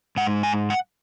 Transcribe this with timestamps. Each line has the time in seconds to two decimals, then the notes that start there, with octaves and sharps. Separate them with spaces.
0.16 G#2 G#3 F#5
0.43 G#5
0.70 F#5